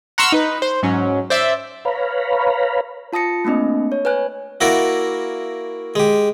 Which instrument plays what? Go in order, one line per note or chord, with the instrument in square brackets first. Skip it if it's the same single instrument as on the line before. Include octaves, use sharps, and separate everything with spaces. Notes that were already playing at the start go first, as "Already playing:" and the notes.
[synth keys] F#5 A#5 C6 C#6 E6 F6
D#4 B4
C5
G#2 F#3 C#4
C5 D5 E5
[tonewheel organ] B4 C#5 F5 A#5 B5
[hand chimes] F4 A5 D#6 A#6 C#7
A3 A#3 C4 D4 D#5
C#5
B4 C#5 G#5 F#6
[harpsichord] A#3 E4 F#4 A#4 D5
G#3 G4